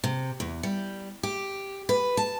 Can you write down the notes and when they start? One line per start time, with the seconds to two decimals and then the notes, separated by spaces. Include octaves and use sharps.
0.04 C3
0.40 E2
0.63 G3
1.23 G4
1.89 B4
2.17 A5